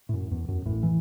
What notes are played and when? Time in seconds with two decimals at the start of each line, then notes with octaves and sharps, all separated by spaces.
0.09 A2
0.14 F#2
0.31 E2
0.48 F#2
0.66 A1 A2
0.83 E3